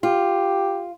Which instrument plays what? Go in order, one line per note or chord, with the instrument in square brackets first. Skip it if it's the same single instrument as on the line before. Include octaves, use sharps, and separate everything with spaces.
[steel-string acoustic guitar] F4 [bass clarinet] G4